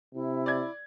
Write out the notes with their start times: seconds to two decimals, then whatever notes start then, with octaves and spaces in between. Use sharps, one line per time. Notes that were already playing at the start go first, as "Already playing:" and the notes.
0.15 C3 E4
0.46 D5 G#6